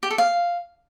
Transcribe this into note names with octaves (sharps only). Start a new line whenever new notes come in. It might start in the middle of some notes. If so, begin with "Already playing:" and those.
G4
A4
F5